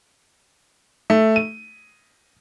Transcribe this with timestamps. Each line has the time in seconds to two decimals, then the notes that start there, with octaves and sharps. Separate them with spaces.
1.10 A3
1.36 D#7